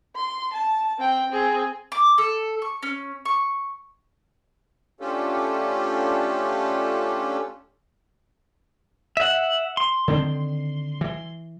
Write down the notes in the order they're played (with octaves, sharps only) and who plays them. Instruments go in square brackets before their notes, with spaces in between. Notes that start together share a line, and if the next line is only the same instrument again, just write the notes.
[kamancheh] C6
A5
C4 G5
C4 G#4
[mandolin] D6
A4
C#6
C#4
C#6
[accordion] A3 C#4 D4 F4 G4 A4
[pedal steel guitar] E5 F#5
C6
[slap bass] D3 D#3 C4
E3